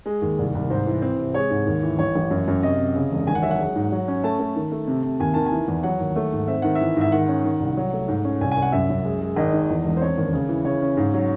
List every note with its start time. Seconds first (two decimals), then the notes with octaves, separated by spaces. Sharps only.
0.06 G#3
0.22 D#2
0.38 C2
0.55 C2
0.70 G#2 C5
0.86 E3
1.02 C4
1.18 C3
1.34 G#3 C#5
1.50 G#2
1.67 D#2
1.83 E3
1.98 A1 C#5
2.15 A1
2.31 F#2
2.48 F#2
2.63 C3 D#5
2.79 C3
2.95 C#3
3.12 E1
3.27 G#1 G#5
3.35 F#5
3.43 F#3 E5
3.51 F#5
3.59 G#3
3.76 G#2
3.92 F#3
4.08 C#4
4.24 A3 A5
4.40 A3
4.56 D#3
4.72 A3
4.87 C3
5.03 C3
5.20 D#2 G#5
5.34 D#3 A5
5.46 G#5
5.52 E3
5.68 E2
5.83 F#3 F#5
6.00 D#2
6.16 A3
6.32 G#2
6.48 C4 E5
6.62 D#3 F#5
6.75 E5
6.81 E3
6.97 G#2 E5
7.12 D#3 F#5
7.28 C#4
7.44 D#3
7.60 C2
7.77 F#3
7.93 A3
8.08 G#2
8.25 C#4
8.41 C2 G#5
8.51 C2 G#5
8.62 F#5
8.72 F#2 E5
8.90 F#2
9.05 G#3
9.21 G#3
9.36 G#1 D#5
9.53 D#3
9.70 E2
9.85 E1
9.97 C5
10.01 C4 C#5
10.18 D#2
10.33 C#3
10.49 E3
10.65 C#3 C#5
10.82 C#4
10.97 G#2
11.14 F#3